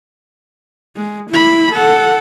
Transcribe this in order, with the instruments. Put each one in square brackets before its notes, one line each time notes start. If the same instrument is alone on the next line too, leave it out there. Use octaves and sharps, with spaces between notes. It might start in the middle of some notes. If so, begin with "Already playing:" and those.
[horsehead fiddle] G#3
E4 B5
A4 F#5